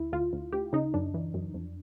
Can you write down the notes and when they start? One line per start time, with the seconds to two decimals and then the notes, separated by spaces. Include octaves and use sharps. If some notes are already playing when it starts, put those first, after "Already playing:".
Already playing: D2 E4
0.13 D2 F4
0.33 D2
0.52 D2 G4
0.73 C#3 D#4
0.94 F#2 D4
1.14 E3
1.34 F#2
1.54 F2